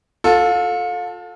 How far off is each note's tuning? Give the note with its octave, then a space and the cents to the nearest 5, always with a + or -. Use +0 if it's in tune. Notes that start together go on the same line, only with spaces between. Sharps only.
F4 +35 A4 +0